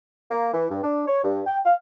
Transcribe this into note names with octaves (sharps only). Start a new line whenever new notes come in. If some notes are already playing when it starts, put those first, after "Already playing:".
A#3
E3
G2
D4
C#5
G2
G5
F5